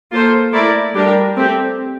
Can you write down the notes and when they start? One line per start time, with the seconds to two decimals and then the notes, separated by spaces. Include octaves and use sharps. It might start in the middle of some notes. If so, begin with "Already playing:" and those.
0.12 A#3 F4 A4 C5
0.53 A3 E4 A#4 D5
0.94 G3 D4 G4 A#4
1.35 A3 C4 G4